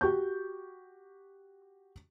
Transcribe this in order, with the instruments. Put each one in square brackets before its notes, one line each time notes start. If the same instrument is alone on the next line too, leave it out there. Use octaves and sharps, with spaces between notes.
[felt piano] F#4 G4 C#6 G6